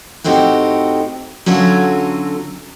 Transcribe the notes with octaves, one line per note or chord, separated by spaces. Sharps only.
A2 A3 C4 D#4 F#4 G4
D3 F#3 C#4 F4 F#4 A4